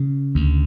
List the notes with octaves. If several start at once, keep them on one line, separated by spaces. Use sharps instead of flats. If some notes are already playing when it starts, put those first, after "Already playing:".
Already playing: C#3
D2